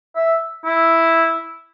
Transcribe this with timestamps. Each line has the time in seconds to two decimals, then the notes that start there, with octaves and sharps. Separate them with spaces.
0.16 E5
0.65 E4